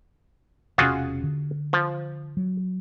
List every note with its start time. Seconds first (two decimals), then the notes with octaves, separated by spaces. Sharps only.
0.78 E1 C3 C#4 F4 F#4 G#4
1.24 D3
1.73 F3
2.37 F#3